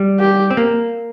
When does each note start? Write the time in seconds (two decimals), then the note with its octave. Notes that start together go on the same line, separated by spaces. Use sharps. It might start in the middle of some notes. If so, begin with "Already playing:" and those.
Already playing: G3
0.20 G4
0.50 C4
0.57 A#3